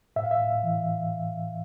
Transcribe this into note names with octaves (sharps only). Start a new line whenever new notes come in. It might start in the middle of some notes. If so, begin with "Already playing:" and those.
A2 E5
F5
E5
A2
E3